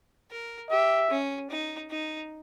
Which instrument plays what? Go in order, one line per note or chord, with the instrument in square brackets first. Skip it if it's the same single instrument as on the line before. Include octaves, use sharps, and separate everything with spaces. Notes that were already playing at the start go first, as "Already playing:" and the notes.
[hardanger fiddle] A#4
[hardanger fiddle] G4 [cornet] E5
[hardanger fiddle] C#4
D#4
D#4